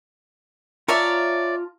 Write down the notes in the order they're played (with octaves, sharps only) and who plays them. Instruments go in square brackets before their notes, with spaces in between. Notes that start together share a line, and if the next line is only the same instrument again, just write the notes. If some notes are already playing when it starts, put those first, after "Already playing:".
[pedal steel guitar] F4 A5 A#5 [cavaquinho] C#5 D5 E5